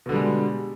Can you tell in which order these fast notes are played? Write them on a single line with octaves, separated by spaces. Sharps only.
B2 D3 G3 G#3